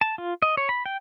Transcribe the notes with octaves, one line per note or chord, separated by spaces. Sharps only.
A5
F4
D#5
C#5
B5
G5